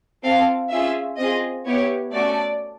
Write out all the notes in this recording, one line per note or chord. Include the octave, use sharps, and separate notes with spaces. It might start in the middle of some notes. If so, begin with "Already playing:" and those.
C4 F4 A4 F5
C#4 F4 G#4 E5
C4 F4 G#4 D#5
B3 E4 G4 C#5
A3 C#4 F#4 A4 D5